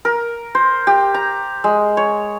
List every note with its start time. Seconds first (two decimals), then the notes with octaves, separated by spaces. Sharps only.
0.05 A#4
0.55 C5
0.87 G4
1.14 A#5
1.64 G#3
1.97 C#5